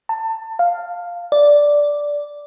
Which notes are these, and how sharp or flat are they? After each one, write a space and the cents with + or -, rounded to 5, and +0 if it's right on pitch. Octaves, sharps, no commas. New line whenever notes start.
A5 +25
F5 +0
D5 -5